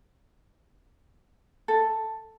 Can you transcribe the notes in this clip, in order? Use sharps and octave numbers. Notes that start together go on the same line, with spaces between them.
A4